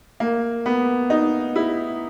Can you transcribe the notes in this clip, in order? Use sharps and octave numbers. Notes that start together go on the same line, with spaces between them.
A#3
B3
D#4
E4